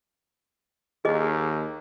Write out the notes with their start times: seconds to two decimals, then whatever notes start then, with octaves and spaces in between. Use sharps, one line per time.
1.05 D#2 G#4 D#5